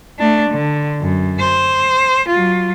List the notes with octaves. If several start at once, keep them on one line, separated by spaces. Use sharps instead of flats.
A3 D4
D3
F#2
C5
F#3 F4